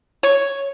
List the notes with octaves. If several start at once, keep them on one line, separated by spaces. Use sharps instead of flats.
C#5